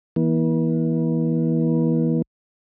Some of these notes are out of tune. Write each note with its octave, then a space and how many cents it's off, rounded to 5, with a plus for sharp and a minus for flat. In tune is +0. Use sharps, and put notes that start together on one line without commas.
E3 -20 B3 -45